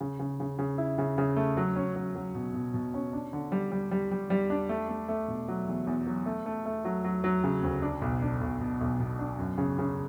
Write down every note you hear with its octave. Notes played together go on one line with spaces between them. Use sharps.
C#3
C#3
C#3
C#3
E4
C#3
C#3
A3
F#3
C#4
F#3
F#3
B2
B2
B2
C#4
D4
D3
G3
G3
G3
G3
G3
D4
A3
A3
A3
B2
F#3
E2
E2
F#3
A3
A3
A3
F#3
F#3
F#3
C#3
D2
D4
B1
D4
B1
B2
B1
B2
D4
F#2
C#3
C#3